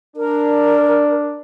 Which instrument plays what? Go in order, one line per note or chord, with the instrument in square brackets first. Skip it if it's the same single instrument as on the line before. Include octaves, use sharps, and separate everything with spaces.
[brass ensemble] D4 [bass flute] A#4